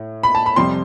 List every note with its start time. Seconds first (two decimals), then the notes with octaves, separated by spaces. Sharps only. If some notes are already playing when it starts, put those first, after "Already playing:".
Already playing: A2
0.23 B5
0.35 A5
0.46 B5
0.56 F2 C3 G3 C6